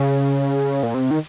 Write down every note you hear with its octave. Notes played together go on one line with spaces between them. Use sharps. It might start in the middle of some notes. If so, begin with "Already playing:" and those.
Already playing: C#3
A#2
C3
D#3